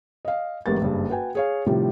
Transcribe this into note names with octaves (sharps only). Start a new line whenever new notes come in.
D#5 F5
A1 G#2 G3 A#3 B3 A6
F#1 G2
F#4 B4 G5 G#5
G#4 C#5 F5
A2 C3 D#3 F3 G3